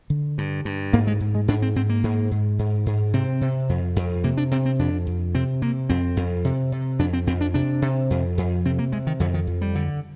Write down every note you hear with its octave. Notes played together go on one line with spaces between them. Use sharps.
D3
G2
G2
G#2 A#3
G#3
G#2
G#3
G#2 D4
C4
G#2 C4
A#3
G#2
G#2
G#2
G#2
C3 C4
C3
F2
F2
C3 A#3
D4
C3 C4
C4
F2 D4
F2
C3 C4
C3 A#3
F2 C4
F2
C3
C3
F2 D4
C4
F2 C4
D4
C3 D4
C3
F2
F2
C3 C4
A#3
C3 G#3
D#3
F2 D3
D#3
F2
G3
D3